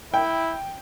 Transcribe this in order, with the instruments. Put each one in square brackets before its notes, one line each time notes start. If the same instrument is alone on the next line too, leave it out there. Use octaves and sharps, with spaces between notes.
[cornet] E4 [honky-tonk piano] G5